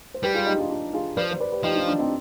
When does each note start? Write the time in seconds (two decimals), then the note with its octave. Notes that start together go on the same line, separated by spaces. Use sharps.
0.14 C5
0.23 G3 G4 B4
0.34 F4 G#4
0.46 D#4 G4
0.58 D4 F4
0.70 D4 F4
0.93 F4 G#4
1.17 F3 B4 D5
1.31 C5
1.40 B4 D5
1.52 G4 B4
1.63 F3 D#4 G4
1.75 D4 F4
1.88 D4
1.99 C4 D#4